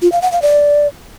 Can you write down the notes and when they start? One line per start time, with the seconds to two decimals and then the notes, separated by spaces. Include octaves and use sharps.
0.02 F4
0.12 F5
0.22 F#5
0.32 F5
0.42 D5